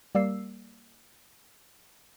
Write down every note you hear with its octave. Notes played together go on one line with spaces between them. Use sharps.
G3 A#3 D5 E6 C7